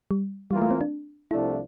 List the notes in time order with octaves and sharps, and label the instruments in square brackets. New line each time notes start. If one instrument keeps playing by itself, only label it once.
[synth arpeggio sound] G3
[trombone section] E2 E3 A#3 F4 [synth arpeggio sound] G3
[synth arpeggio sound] A3
C4
D4
[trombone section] C2 C3 F3 A3 D4 [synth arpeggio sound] E4